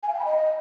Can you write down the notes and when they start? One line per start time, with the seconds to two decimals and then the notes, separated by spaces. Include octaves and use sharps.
0.03 G#5
0.09 F5
0.14 G5
0.20 B5
0.25 D#5